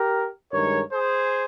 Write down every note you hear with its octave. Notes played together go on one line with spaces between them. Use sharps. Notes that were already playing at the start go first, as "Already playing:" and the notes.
Already playing: G4 A#4
G2 D#3 G#3 A#4 C#5
G#4 C5